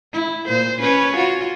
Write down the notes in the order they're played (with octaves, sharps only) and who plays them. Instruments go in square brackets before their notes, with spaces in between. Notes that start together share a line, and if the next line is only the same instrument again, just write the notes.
[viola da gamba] E4
A#2 C5
C#4 B4 C#5
F4 F#4